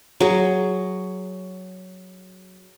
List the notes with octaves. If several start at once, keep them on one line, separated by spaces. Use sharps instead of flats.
F#3 G#4